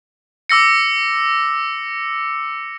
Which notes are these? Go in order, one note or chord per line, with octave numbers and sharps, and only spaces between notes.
D6 E6 A#6 C#7